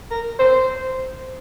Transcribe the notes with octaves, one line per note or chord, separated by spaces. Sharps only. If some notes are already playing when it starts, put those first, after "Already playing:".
A#4
C5